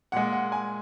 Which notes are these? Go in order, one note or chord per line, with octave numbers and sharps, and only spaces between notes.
A#2 G#3 F#5
F#5
G#5